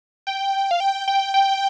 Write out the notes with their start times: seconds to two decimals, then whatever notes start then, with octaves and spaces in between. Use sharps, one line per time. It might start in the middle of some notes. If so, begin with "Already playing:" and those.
0.27 G5
0.71 F5
0.80 G5
1.08 G5
1.34 G5